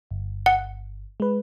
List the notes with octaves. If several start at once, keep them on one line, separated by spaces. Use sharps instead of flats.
G1
F#5
G#3 B4